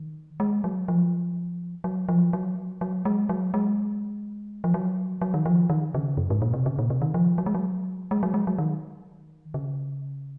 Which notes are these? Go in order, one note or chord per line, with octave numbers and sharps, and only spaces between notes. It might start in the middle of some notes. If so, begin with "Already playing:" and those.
Already playing: D#3
G#3
F#3
F3
F#3
F3
F#3
F#3
G#3
F#3
G#3
F3
F#3
F#3
D#3
F3
D#3
C#3
F#2
G#2
A#2
C3
C#3
A#2
C3
D#3
F3
F#3
G#3
F#3
G#3
F#3
G#3
F#3
D#3
C#3